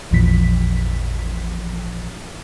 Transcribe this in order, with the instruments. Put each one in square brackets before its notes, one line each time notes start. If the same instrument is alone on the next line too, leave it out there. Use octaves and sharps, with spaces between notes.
[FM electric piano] A1 E2 A#2 E3 F3 B6